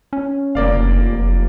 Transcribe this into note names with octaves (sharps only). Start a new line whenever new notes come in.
C#4
F1 A#3 D5 F5
F#1